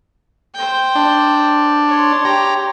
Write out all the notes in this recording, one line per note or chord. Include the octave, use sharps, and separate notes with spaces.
C5 G5
D4
C#5 C6
G4 A#5